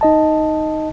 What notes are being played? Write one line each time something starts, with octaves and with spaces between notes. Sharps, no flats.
D#4 D#5 A5